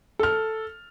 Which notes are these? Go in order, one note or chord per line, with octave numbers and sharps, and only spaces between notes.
A4 F6